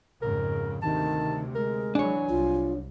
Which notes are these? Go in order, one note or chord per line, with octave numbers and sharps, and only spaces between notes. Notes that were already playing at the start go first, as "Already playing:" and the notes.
F2 G#2 C#3 A#4
D2 C3 D#3 A5
G#3 A#4
E3 F#3 D4 C#5 G#5
C2 F4